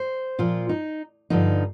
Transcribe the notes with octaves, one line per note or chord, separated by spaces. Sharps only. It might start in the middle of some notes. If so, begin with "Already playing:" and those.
Already playing: C5
A#2 F3 F4
D#4
G2 D3 F3 D#4